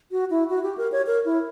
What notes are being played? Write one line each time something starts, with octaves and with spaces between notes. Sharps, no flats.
F#4
E4
F#4
G4
A#4
C#5
A#4
E4